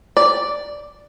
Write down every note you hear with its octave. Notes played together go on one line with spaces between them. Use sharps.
D5